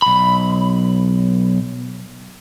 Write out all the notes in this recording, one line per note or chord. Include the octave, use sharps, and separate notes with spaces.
B1 B5